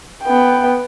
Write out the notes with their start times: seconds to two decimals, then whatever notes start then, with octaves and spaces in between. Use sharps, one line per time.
0.24 B3 G5